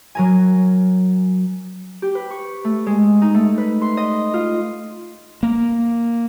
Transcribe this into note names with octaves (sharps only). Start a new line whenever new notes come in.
F#3 A#4 G#5
G4
B4
C#6
A3
G#3
D#4
A3
B4
C6
D#5
F4
A#3